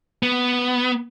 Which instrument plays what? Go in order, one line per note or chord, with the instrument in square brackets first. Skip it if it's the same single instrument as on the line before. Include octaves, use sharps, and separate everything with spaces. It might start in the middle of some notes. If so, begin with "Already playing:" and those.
[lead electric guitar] B3